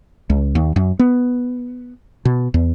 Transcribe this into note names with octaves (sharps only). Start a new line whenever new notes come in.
C#2
D#2
F#2
B3
B2
E2